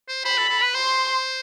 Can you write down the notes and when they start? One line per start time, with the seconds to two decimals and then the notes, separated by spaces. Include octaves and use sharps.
0.08 C5
0.25 C5 B5
0.38 A4
0.50 A4
0.62 B4
0.75 C5 C6